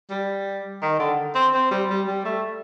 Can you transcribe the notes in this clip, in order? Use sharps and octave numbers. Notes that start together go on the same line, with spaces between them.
G3
D#3
D3
C4
C4
G3
G3
G3
A3